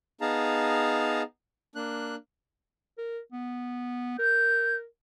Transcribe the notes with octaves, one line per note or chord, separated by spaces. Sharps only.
B3 D#4 G#4 F5 A5 A#5
A#3 D4 F#6
A#4
B3
A#4 G6